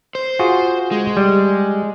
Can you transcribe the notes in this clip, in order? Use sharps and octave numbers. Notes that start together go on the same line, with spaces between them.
C5
F4 F#4 G#4
G#3
G3